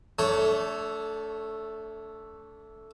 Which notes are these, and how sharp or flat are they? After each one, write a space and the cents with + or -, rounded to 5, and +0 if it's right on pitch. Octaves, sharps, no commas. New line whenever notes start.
A3 +0 D4 -35 C#5 +0